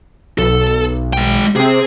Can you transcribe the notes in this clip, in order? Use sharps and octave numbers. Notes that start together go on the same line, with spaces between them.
B1 A4
G#3 G5
C3 C4 G#4